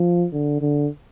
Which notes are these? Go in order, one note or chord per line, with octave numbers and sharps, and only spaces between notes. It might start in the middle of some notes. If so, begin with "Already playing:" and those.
Already playing: F3
D3
D3